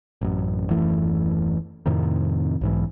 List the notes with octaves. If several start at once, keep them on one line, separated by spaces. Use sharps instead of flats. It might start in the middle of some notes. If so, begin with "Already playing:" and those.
A1 F#2
D#1 F#2 E3 A3
F2 A2 C3 D#3
B1 G#2 E3